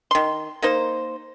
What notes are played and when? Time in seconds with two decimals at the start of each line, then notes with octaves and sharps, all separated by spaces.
0.11 D#3 C6
0.62 A#3 D#4 C5